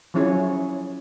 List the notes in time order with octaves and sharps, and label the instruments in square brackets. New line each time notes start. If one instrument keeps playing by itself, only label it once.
[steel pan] F3 F#3 C#4 E4 G#4 C#5